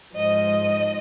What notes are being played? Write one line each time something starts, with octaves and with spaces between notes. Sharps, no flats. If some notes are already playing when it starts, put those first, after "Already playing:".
G#2 F3 D#5